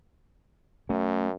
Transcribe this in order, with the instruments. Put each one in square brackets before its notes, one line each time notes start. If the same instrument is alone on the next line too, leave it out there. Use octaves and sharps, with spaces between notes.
[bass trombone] F#2 [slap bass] A3 C#4